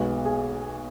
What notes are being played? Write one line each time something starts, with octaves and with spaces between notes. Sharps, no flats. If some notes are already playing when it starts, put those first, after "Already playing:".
Already playing: B1 B2 G#3 B3 F#4
G#4